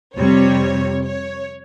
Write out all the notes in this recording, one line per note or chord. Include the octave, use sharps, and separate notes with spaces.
F2 C3 G3 C#5
C#5